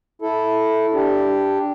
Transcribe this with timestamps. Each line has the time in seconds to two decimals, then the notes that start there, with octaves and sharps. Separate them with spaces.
0.22 E4 A4
0.94 D4 G4